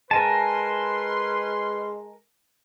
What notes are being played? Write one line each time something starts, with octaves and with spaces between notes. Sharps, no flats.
G#3 C#4 A#4 B4 G#5 A5 C6